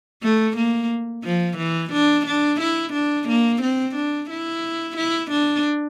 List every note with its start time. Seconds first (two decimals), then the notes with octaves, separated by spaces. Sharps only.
0.23 A3
0.57 A#3
1.24 F3
1.57 E3
1.92 D4
2.26 D4
2.60 E4
2.93 D4
3.28 A#3
3.62 C4
3.95 D4
4.30 E4
4.97 E4
5.30 D4